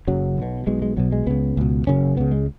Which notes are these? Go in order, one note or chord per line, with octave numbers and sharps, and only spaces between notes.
F#1 F#2 C#3 F#3
B1 B2
B1 B2 G#3
G#3
B1 B2 F#3
G#3
C#2 C#3 B3
C#2 B2
F#1 F#2 C#3 C#4
C#2 C#3 B3
G#3